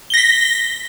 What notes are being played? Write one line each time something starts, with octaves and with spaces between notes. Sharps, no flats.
A#6 B6 G7